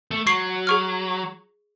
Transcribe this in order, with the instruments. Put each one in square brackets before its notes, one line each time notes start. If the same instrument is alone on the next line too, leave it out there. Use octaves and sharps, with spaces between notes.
[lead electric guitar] A3
[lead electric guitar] F#3 [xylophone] C#6 C7
[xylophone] G#4 C#6 F6